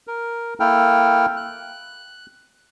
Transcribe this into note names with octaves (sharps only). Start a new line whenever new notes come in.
A#4
A#3 E4 A4 G5 F6
F#6